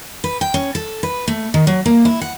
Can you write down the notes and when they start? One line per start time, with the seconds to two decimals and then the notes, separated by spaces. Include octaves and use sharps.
0.24 B4
0.41 G5
0.54 C#4
0.75 A4
1.03 B4
1.28 A3
1.54 D#3
1.67 F#3
1.86 A#3
2.05 E4
2.21 F#5